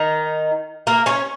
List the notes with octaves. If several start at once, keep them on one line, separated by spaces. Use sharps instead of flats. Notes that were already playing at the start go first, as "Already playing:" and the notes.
Already playing: D#3 D#4
A#3 A#4
C#4 C#5